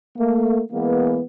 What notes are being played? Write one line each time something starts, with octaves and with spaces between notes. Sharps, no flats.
A3 A#3
E3 G#3 A#3 B3